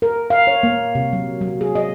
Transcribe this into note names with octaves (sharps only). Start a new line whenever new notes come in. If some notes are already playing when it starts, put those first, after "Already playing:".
A#4
F5
C#5
A#3
C3
F#3
F#3
G#4
D#5